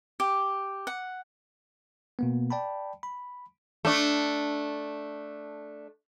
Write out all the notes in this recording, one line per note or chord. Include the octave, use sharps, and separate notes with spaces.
G4
F#5
B2 A#3 B3
D5 G5 A5 B5
B5
A3 D4